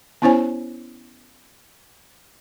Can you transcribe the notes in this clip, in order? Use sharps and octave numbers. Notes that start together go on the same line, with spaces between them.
B3 C#4 E4 C5 C#5 G#5